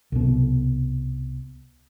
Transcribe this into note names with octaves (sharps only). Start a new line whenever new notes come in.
C2 B2